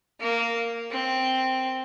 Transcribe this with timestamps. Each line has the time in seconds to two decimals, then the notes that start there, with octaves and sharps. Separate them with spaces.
0.20 A#3
0.91 C4